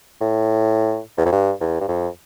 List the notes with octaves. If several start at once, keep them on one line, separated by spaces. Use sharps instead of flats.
A2
E2
F2
G2
E2
G2
F2